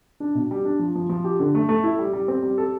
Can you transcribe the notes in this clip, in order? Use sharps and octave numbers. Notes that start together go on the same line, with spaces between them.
D4
B2
G3
D4
F3
F3
F3
G4
D3
A3
A3
E4
G3
G3
C4
G3
A4